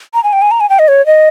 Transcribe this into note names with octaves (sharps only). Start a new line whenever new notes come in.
A#5
G#5
G5
G#5
A#5
G#5
G5
D#5
C#5
D#5